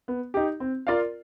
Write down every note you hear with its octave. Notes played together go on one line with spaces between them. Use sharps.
B3
D#4 G4
C4
F4 A#4 D5 F5